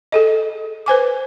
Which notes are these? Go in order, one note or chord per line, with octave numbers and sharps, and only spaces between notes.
G#4 A4 D#5
B4 C5 G#5 D6